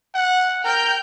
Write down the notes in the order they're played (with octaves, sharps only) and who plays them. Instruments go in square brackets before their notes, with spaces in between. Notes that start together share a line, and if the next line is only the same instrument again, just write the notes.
[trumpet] F#5
[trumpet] A#4 [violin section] G5 F6 G6